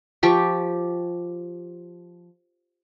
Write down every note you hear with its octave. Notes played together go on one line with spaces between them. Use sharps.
F3 G4 C#6